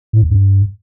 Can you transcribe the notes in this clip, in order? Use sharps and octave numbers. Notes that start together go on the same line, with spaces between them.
A2
E2
G2